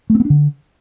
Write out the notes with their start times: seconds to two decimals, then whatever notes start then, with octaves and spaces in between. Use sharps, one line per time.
0.10 A3
0.15 C4
0.20 B3
0.25 D4
0.30 D3